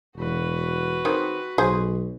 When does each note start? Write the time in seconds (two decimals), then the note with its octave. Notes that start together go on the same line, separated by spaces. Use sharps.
0.17 E1 F#4 B4
1.05 D#3 G#3 C4
1.58 B1 G#4 C5